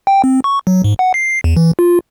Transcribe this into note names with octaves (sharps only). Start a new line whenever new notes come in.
G5
C4
C#6
F#3
G#2
F#5
C7
E2
E3
F4